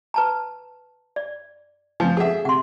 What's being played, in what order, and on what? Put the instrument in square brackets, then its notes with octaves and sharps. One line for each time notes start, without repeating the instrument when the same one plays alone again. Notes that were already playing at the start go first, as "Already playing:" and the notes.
[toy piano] B4 A5 A#5
D5
[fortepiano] F3 [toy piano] G#5
[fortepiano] G#4 E5 [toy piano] A4 F#5
[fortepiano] C3 [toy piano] F#5 C6